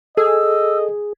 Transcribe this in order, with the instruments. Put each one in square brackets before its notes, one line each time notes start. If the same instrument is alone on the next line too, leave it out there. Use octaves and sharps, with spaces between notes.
[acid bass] G#4 [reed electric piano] A4 [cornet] D#5 [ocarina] E6